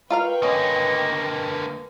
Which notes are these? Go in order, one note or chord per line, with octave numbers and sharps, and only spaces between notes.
F4 A#4 B4 F5 G5 C#6
D3 A#3 C#4 D#5